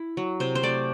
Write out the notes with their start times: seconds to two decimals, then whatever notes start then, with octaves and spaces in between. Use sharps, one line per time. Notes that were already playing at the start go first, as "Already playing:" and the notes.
Already playing: E4
0.17 F#3
0.40 C3 C5
0.55 C5
0.63 A3 D5